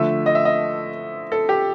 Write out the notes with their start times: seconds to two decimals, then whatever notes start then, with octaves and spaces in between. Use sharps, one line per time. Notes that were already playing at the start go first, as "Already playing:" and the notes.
Already playing: D3 F3 A3 E5
0.26 D#5
0.35 E5
0.45 D#5
1.32 A4
1.49 G4